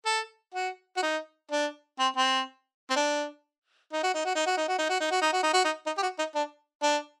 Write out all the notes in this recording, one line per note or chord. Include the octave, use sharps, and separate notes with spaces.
A4
F#4
F#4
D#4
D4
C4
C4
C4
D4
D#4
F#4
D#4
F#4
D#4
F#4
D#4
F#4
D#4
F#4
D#4
F#4
D#4
F#4
D#4
F#4
D#4
D#4
G4
F#4
D#4
D4
D4